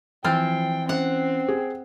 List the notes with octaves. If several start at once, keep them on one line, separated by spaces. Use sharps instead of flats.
E3 F3 C4 G5 F6 A6
C4 C#4 F#5
G#4